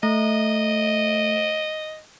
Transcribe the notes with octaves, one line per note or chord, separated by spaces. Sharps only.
A3 D#5